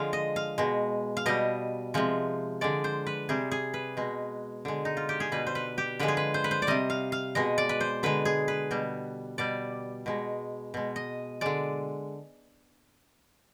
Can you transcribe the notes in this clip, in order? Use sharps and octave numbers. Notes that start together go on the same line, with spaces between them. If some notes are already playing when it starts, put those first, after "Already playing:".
Already playing: D3 F3 G#3 F5
D#5
F5
B2 G#3
F5
B2 G3 D#5
C3 F3 G#3
D3 G#3 D5
C5
B4
C3 G3 G#4
G#4
B4
B2 G#3
D3 G#3
D#4
F4
G4
G#4
B2 G3 B4
C5
B4
G4
D3 F3 G#3 B4
G#4
B4
C5
B4
C5
D5
C3 G3 D#5
F5
F5
B2 G#3 D#5
D5
B4
C5
D3 G#3 B4
G#4
B4
B2 G3
B2 G3 D5
B2 G#3
B2 G#3
D#5
D3 G#3 D5